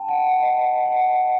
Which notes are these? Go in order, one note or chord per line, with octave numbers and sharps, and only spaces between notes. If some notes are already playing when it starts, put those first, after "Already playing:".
Already playing: G5 A5
F#5
D#5
F#5